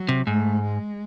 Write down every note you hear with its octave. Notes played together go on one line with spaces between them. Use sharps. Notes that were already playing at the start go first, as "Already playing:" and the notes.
Already playing: F#3
C3
G#2 A3
G#3